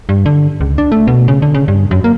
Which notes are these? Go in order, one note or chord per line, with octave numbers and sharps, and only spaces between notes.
G2
D3
C#2
D4
A3
B2
C#3
D3
C#3
G2
F#2
A#3